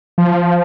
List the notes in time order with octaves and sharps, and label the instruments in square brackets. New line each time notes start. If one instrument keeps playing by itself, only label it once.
[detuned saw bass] F3